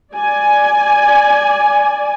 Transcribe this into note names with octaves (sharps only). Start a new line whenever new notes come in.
D5 G#5